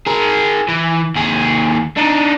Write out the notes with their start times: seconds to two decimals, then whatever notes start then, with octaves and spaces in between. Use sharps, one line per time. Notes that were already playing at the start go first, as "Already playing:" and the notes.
0.07 G#4 A#4
0.68 E3
1.16 D#2 G#4
1.97 D4 D#4